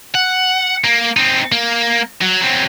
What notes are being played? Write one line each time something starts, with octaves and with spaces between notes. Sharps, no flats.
F#5
A#3
C4 D#4
A#3
F#3
F#3 C4